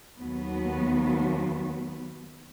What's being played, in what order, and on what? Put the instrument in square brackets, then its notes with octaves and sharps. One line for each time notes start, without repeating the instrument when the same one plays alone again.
[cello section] D#2 F#3 B3